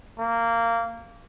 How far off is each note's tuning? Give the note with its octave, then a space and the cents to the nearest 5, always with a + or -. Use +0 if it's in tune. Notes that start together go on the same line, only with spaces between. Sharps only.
A#3 -15